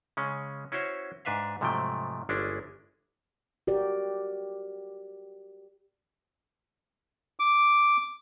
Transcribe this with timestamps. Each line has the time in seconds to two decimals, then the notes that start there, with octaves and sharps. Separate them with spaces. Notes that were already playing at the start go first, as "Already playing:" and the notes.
0.17 C#3 G#3 C#4
0.72 C#4 E4 F#4 C5 C#5
1.25 G#2 D4 B4 E5 F5
1.61 G#2 C3 F3 F#3 A3 G5
2.29 G1 G#3 C#4 D4 E4
3.67 F#4 G4 A#4 D5
7.40 D6